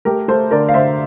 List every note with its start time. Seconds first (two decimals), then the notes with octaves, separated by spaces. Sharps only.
0.05 A3 G4 A#4
0.28 A3 A4 C5
0.51 D3 A#4 D5
0.69 F5
0.74 D3 C5 E5